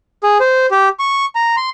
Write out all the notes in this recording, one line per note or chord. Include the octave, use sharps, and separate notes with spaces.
G#4
C5
G4
C#6
A#5
C6